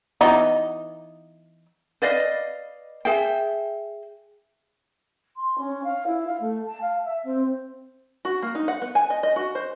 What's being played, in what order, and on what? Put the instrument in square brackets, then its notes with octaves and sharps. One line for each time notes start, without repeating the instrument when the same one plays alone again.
[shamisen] E3 B3 D#4
[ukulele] B4 D5 D#5 F5
G#4 E5 G5
[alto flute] C6
C#4
F5
E4
F5
A3
A5
F5
E5
C4
[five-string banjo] F#4
A#3
D#4
F#5
B3
G#5
D#5
D#5
F#4
C5